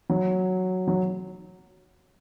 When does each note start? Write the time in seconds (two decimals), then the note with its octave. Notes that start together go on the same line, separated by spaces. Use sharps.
0.10 F#3
0.88 F#3